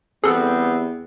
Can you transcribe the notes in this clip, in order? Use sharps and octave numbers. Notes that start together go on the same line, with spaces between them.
E2 G3 B3 C4 G#4 A4